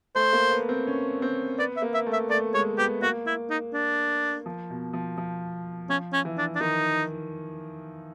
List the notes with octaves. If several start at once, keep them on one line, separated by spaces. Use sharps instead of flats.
A3 C5
A#3
B3
C4
C#4
C4
B3 D5
E5
A#3
E5
A3
E5
A3 D5
G#3 C#5
B3 G4
A#3 F#4
E4
D#4
D4
F3
B2
F3
F3
F3 C#4
C#4
E3
D4
D4
D#3 D#4